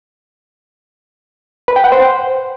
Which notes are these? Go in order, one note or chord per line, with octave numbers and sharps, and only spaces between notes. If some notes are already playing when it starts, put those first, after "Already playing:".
B4
G5
F#5
C5